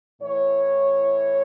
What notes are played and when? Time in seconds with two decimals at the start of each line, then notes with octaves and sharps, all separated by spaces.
0.21 A2 E3 C#5